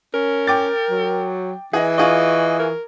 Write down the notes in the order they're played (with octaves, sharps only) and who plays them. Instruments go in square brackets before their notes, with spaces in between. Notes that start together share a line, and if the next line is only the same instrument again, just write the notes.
[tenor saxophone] C#4 [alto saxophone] A#4
[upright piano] G5 D6 A6
[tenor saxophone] F#3
[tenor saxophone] E3 [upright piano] G#4 D#5
[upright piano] F4 G#4 C#6 [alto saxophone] D#5
[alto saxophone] A#4